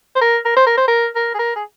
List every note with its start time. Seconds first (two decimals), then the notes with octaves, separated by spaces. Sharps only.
0.16 C5
0.21 A#4
0.45 A#4
0.56 C5
0.66 A#4
0.77 C5
0.88 A#4
1.16 A#4
1.34 G#4
1.39 A#4
1.56 G#4